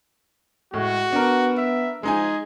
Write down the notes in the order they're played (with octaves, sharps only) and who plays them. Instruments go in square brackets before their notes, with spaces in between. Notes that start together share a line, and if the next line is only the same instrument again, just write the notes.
[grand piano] A2 [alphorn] G#3 [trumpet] F#4
[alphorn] B3 [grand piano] D4 A#4
[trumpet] E5
[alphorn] F3 [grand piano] G#3 D#4 G#5 [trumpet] G#4